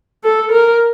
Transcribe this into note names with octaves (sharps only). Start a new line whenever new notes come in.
A4
A#4